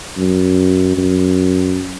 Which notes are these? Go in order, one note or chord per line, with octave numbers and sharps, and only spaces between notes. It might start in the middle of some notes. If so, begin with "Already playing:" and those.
F#2
F#2